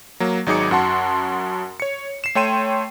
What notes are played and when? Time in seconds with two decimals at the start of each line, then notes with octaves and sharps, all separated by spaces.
0.20 F#3 A#3
0.46 G#1 F#3 D#4 G#4 D6 C#7
0.71 F#2 F#4 F#5 A5 C6
1.80 C#5 C#7
2.24 C7 E7
2.35 A3 C#5 G5 C6 D#7 E7